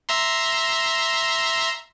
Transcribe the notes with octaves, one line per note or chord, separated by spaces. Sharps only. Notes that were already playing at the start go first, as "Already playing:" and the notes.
E5 A#5 C6